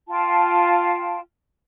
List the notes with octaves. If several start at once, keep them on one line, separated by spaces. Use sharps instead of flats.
F4 G5 A5